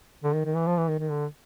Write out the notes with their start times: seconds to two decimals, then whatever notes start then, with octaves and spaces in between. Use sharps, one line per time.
0.23 D3
0.34 D#3
0.45 D#3
0.56 E3
0.67 F3
0.78 E3
0.89 D#3
0.99 D#3
1.10 D3